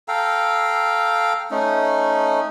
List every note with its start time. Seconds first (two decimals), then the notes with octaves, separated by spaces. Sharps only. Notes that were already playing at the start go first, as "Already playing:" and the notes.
0.08 A4 F5 G5 A#5
1.51 A3 C#4 D#4